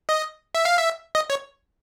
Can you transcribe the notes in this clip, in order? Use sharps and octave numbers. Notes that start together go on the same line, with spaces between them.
D#5
E5
F5
E5
D#5
C#5